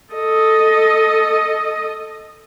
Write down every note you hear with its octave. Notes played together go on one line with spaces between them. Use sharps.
A4 D#5